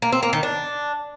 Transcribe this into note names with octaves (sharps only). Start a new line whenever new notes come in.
A#3
C4
A#3
D#3
D4